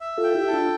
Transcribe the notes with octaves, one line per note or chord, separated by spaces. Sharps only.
E5
F4 A4
G5
E4 G4
A4
D4 F4